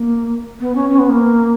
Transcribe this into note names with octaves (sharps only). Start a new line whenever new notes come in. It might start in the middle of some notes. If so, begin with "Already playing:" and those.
Already playing: A#3
B3
C#4
C#4
B3
A#3